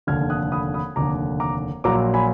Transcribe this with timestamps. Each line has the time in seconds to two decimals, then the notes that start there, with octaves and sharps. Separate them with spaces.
0.07 F1 D#2 D3 F6 G#6
0.30 D#6 F#6
0.52 B5 D#6
0.74 B5 D#6
0.96 F1 D#2 D3 A#5 D6
1.40 A#5 D6
1.84 A#1 A#2 F#3 A#5 D6
2.14 G#5 B5